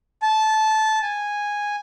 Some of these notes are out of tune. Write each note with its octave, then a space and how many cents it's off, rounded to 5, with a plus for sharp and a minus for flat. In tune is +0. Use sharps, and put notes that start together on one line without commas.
A5 -15
G#5 -10